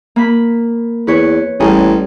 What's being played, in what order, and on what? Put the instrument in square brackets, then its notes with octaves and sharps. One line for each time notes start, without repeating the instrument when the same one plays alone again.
[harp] A#3 B5
[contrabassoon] E2 [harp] B4 C#5
[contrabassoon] A1 [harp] G3 C#4 G#4